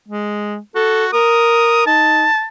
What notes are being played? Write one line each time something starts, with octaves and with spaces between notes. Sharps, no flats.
G#3
F#4 A4
A#4 D#6
D#4 A5